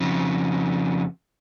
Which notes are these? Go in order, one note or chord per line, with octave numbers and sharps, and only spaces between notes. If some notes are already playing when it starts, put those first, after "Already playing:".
F2 C#3